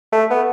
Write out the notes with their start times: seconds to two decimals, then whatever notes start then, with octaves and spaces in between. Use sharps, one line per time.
0.13 A3
0.30 B3